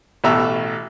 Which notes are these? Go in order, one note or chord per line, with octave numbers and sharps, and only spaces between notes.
A1 B2 A3 G4 E5 A#5